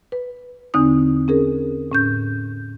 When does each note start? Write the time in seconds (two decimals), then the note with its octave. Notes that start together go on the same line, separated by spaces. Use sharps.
0.12 B4
0.74 E2 D3 C4 D#4 D#6
1.28 C#4 G#4 A#4
1.92 A2 C#4 G6